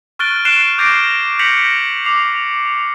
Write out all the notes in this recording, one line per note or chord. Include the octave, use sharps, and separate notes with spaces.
C#6 F6 F#6 A6 D7 G7
C#6 F#6 C7 D7 E7 G7
D6 G6 A6 A#6 C7 D7
G6 A#6 B6 C#7 F7 F#7
D6 C7